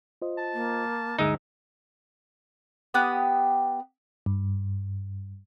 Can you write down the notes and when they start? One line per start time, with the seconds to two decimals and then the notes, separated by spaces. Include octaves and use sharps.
0.22 F4 C5 D#5
0.38 A5
0.54 A#3
1.19 D2 G2 D3 G#3 D#4 E5
2.94 B3 G4 D#6 F#6
4.26 G2